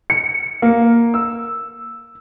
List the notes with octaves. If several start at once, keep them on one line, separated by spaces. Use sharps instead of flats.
C#7
A#3
E6